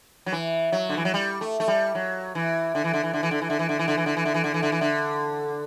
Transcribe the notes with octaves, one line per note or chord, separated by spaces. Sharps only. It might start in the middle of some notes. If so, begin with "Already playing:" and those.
F#3
E3
F#3
D3
E3
F#3
G3
A3
A3
G3
F#3
E3
D3
E3
D3
E3
D3
E3
D3
E3
D3
E3
D3
E3
D3
E3
D3
E3
D3
E3
D3
E3
D3
E3
D3